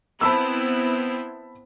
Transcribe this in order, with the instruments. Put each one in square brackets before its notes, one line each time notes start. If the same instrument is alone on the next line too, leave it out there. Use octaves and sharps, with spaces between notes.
[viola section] B3 C4 E4 [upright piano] A5 B5 E6